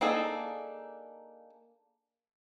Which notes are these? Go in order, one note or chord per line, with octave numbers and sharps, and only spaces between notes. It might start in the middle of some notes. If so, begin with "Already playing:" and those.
A#3 D4 D#4 G#4 A4